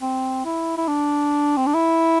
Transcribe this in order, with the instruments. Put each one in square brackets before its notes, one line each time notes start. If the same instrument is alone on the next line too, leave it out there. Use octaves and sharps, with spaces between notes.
[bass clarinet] C4
E4
E4
D4
C4
D4
E4